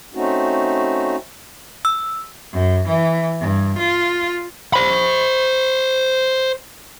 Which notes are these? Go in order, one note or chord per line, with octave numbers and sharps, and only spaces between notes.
A3 C4 C#4 D#4 F#4
E6
F#2
E3
G2
F4
C5 B5